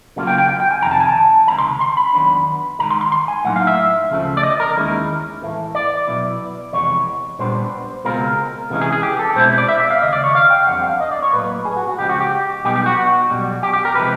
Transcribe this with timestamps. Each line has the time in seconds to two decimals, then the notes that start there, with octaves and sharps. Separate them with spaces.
0.16 C#3 F#3 A#3 C#4 F4
0.27 G5
0.38 G5
0.49 G5
0.60 G5
0.71 G#5
0.82 F2 C3 D#3 A#5
0.91 A5
1.00 G#5
1.09 A5
1.48 C#2 C3 D#3 A#5
1.58 C6
1.81 C6
1.97 B5
2.13 D#2 D#3 F#3 B3 D4
2.79 G#2 D#3 G#3 A#5
2.91 C6
3.01 C6
3.12 C6
3.28 G#5
3.45 A2 F#3 A#3 D#4 F#5
3.56 F5
3.67 E5
4.10 D2 C#3 F3 A3
4.37 D5
4.43 D#5
4.60 A#4
4.76 D#2 D#3 G#3 C#4 E4
5.42 A2 E3 A3
5.75 D5
6.07 B2 F#3 B3 E4
6.73 F2 C3 E3 G#3 B3 C#5
7.39 A#2 G3 B3 D4 C5
8.04 C#2 B2 G#3 C4 F4 A#4
8.70 C3 E3 G#3 C#4
8.81 G#4
8.92 G#4
9.03 G4
9.19 A4
9.36 B2 G#3 C4 E4 C5
9.58 D5
9.69 E5
9.80 E5
9.90 F5
10.02 D#2 C#3 D#5
10.13 D5
10.24 C#5
10.35 F5
10.50 G5
10.67 F2 D3 G3 C4 F#5
10.84 F5
11.00 D#5
11.11 D5
11.22 C#5
11.33 A2 F#3 A#3 B4
11.65 G#4
11.77 F#4
11.88 F#4
11.99 C#2 C#3 F3 G#3 G4
12.09 F#4
12.20 G4
12.64 B1 B2 G3 B3 D#4 G4
12.76 G4
12.86 F#4
12.97 F#4
13.30 B1 B2 G3
13.63 G4
13.73 G4
13.85 A#4
13.95 C3 F3 G#3 B4